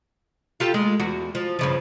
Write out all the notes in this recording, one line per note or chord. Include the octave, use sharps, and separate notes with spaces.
F4 G4 A4
G#3
E2 F#4
F3
G2 C#3 F3